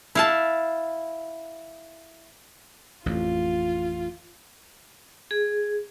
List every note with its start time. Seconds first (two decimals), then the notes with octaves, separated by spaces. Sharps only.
0.15 E4 F5 A5
3.06 A1 F2 F4
5.31 G#4